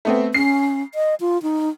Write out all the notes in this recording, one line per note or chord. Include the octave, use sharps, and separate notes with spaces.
A3 B3 C4
C#4 C7
D#5
F4
D#4